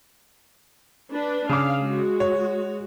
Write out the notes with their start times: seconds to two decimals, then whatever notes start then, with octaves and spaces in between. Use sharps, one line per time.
1.12 D4 B4
1.49 C#3 F5 D6
1.80 G#3 F#4
2.20 C#5